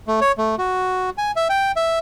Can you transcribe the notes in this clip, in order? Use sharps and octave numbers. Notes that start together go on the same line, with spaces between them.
A3
C#5
A3
F#4
G#5
E5
G5
E5